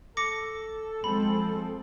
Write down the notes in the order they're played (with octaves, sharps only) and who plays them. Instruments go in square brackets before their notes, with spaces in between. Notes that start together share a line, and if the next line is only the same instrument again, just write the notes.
[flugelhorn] A4 [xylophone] D6 A#6 C#7
[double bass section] F3 G#3 C4 [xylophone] B5